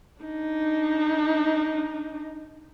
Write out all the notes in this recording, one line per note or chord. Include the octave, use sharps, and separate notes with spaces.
D4 D#4